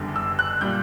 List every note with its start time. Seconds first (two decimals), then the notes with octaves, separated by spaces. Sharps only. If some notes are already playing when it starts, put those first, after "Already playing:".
Already playing: F#1 E2 D3 G3
0.16 E6
0.39 F#6
0.61 A#2 G3 G6